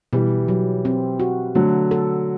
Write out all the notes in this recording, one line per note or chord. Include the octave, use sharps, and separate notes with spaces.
B2 E3 G3
F#3
C4
F#4
D3 F#3 A3
A4